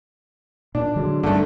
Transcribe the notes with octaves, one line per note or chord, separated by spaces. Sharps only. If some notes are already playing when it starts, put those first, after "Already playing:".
A#2 D4
D3 F#3 G#3
A1 G2 D3 A3